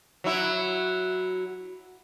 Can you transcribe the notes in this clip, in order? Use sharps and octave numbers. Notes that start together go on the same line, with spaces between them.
F#3 E4